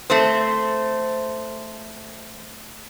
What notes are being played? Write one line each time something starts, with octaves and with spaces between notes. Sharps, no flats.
A3 C4 C5